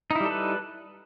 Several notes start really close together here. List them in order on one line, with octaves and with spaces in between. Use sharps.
D#4 E4 G3 A4 B4